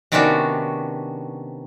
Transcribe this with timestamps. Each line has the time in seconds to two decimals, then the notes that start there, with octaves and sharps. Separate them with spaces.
0.12 C3 D#3 B3 C#4 D4 F#4